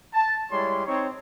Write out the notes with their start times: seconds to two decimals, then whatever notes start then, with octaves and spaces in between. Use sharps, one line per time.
0.14 A5
0.52 G3 G#3 E4 C#5 C6
0.86 C4 D#4 C#5